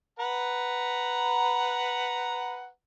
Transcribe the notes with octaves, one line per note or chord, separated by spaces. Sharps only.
B4 F#5 A#5